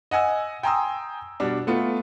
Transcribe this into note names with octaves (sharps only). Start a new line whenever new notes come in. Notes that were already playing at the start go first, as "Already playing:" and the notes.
D#5 F#5 G#5 E6
G5 G#5 A#5 C6 D#6 E6
B2 G3 D4
A3 B3 F4